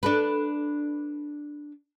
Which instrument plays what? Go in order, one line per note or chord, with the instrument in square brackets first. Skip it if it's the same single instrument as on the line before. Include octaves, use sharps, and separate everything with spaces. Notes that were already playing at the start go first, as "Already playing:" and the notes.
[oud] D4 A4 B4